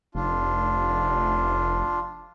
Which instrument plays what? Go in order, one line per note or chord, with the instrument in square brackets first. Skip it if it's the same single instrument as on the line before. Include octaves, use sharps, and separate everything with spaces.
[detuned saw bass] F1 [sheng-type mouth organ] D4 F4